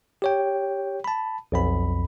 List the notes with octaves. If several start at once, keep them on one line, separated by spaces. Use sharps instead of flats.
G4 C#5 G5
A5 B5
B1 F2 B5